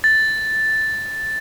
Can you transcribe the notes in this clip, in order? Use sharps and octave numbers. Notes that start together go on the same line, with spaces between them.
A6